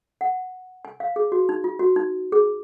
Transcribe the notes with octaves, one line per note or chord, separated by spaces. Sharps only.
F#5
G#5
F5
G#4
F#4
D#4
F4
F#4
D#4
G#4